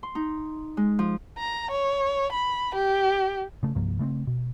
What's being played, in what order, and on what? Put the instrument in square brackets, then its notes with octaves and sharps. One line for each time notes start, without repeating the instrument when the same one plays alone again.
[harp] C6
D#4
G#3
F3
[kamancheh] A#5
C#5
B5
G4
[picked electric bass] C#3 A3
C2 G2 F3 A#3
C#3 A3 B3 C4
B2